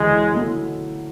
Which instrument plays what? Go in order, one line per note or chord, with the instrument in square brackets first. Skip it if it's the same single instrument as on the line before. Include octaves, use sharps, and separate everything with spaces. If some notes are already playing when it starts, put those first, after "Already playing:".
Already playing: [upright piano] D2 C#3 E3 [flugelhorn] G#3
[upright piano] B2 F#3 A3 E4